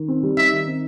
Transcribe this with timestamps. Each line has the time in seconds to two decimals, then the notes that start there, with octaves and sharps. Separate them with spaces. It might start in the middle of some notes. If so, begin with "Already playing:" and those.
Already playing: D#3
0.08 C4
0.23 G3
0.37 D#4 E5
0.52 D#3
0.67 C4